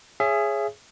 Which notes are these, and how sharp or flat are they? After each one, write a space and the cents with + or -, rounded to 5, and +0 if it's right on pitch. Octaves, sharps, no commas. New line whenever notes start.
G#4 +0 C#5 +0 E5 +30